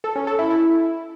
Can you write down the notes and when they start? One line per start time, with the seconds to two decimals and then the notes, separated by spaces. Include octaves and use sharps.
0.04 A4
0.16 C#4
0.27 A4
0.39 E4
0.50 E4